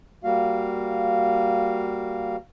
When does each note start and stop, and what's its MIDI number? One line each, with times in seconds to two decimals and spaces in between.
0.24 2.36 55
0.24 2.36 58
0.24 2.36 66
0.24 2.36 77